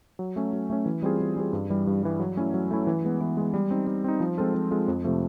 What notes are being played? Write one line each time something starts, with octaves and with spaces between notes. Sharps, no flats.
F#3
A3 C#4
F#3
A3 C#4
E3
G3 C4 F4 G#4
E3
G3 C4 F4 G#4
G2
E3 G3
G2
E3 G3
F#3
A3 C#4 E4
F#3
A3 C#4 E4
E3
G#3 B3
E3
G#3 B3
G3
C4 D#4
G3
C4 D#4
F3
G#3 C4 F4 A4
F3
G#3 C4 F4 A4
F2
C3 F3 A3